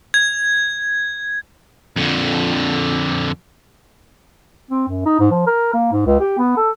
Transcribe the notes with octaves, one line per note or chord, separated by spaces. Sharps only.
G#6
F2 D3
C4
F#2
D#4
G#2
F3
A#4
A#3
G#2
C#2
G4
B3
A4